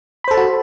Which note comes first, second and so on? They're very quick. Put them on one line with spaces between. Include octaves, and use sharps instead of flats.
B5 C5 A4 A5 F#4